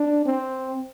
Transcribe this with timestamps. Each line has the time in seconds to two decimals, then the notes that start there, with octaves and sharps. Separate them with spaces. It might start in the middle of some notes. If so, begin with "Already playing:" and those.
Already playing: D4
0.26 C4